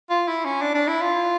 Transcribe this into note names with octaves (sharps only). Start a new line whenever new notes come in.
F4
E4
C#4
D4
D4
E4
F4